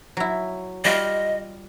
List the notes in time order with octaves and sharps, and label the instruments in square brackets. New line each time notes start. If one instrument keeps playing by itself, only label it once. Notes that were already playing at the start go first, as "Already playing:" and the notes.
[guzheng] F#3 E4
[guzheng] G3 F4 [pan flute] D#5